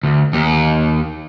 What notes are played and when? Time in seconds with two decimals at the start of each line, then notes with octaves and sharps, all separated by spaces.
0.04 D2
0.33 D#2